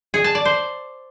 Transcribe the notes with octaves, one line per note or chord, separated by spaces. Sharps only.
G#4
A5
D5
C5